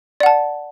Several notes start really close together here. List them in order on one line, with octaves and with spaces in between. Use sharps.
D5 F#5 A5